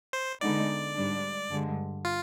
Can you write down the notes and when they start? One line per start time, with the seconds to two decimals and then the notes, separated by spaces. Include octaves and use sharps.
0.13 C5
0.41 D3 G#3 B3 D#4 D5
0.96 G#2 G3 D4
1.50 G2 D3 G#3
2.05 F4